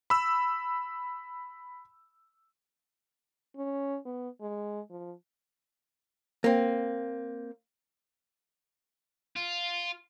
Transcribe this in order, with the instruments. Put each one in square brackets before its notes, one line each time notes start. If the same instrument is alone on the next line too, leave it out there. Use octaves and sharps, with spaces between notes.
[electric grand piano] B5 E6
[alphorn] C#4
B3
G#3
F3
[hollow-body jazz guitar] A#3 C4
[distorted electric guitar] F4